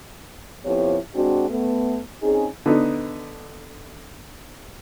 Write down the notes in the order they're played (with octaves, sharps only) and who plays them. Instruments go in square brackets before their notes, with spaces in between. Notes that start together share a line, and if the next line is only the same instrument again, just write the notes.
[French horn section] F2 F3 B3 E4 G4 C#5
G#3 C4 D4 F#4
A3 B3
C4 C#4 D#4 G#4
[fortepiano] D3 B3 D#4